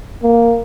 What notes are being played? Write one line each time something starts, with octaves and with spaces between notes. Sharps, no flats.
A#3